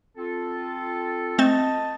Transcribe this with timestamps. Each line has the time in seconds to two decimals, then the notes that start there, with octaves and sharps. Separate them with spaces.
0.16 C4 F4 A4
1.38 A3 C4 D#5 A5